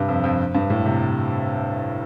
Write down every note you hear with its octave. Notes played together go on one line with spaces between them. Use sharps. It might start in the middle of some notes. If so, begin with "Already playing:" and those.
Already playing: G2 C3
F2
F2
G2
A2
C3